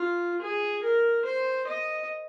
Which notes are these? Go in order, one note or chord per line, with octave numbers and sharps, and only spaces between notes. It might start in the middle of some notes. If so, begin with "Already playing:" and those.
Already playing: F4
G#4
A#4
C5
D#5